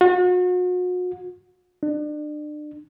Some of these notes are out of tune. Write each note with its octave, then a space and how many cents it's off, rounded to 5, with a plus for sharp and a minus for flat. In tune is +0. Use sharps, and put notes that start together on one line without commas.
F#4 -40
D4 +35